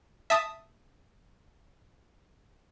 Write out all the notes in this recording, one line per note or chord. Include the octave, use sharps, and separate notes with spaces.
E5 A5 D#6